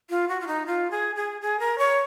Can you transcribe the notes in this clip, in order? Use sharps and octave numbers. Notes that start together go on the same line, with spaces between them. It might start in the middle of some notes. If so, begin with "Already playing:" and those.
F4
F#4
F4
D#4
F4
G#4
G#4
G#4
A#4
C#5